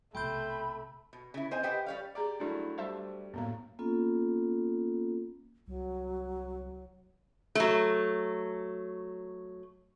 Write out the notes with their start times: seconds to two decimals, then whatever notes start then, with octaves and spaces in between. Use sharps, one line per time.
0.15 B1 C3 A3 G5 B5 C6 G6
1.13 B2
1.34 C#3 E4
1.51 C4 C5 D#5 G#5
1.63 G4 B4 C5 D#5 F#5 G5
1.86 G3 C#5 F5
2.15 G4 G#4 D5 A#5 D6
2.40 G2 F#3 A3 D4 E4 D5
2.78 G3 C5 E5 A5
3.34 F#2 A2 A#3 B3 F5
3.79 A#3 B3 C#4 F4 A4
5.67 C2 F#3
7.55 F#3 A3